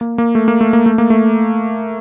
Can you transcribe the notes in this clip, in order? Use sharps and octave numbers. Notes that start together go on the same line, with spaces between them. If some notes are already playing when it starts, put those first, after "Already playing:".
A#3
A#3
A3
A#3
A3
A#3
A3
A#3
A3